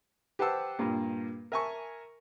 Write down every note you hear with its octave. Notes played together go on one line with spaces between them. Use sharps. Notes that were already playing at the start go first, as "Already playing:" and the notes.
G4 B4 C5 F#5 A5 E6
G2 A#2 G3 A#3
A#4 E5 G#5 A5 C#6